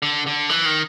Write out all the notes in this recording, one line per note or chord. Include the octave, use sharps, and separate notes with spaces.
D3
D3
E3
D#3